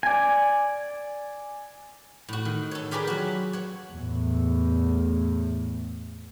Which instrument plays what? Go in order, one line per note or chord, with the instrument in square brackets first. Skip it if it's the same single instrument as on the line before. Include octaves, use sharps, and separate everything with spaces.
[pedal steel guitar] D5 G#5
[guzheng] A2 F#4
D#3
A4 C#5
F4 G4 G#4 A#4 B4 D5
F#3 F#4
C#5 F#5
[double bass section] E2 A2